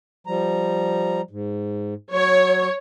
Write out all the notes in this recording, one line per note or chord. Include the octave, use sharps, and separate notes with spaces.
F3 G3 A#5
G#2
F#3 C#5